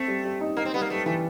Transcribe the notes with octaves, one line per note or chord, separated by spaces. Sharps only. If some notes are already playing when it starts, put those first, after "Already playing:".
Already playing: A3 C4
G3
G3
D#4
A#3 D#4
C4
G3 B3
A#3
G3 A3
E3 A3